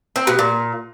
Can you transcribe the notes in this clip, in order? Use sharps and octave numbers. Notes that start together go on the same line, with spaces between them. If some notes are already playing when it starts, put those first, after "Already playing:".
C4
B2
A#2